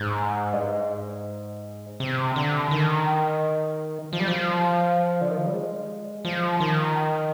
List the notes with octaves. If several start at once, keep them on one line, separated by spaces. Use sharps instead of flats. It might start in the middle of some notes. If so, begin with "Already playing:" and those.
Already playing: G#2
G2
G#2
C3
D3
D#3
F3
G3
F3
D3
D#3
F3
G3
G#3
F3
D#3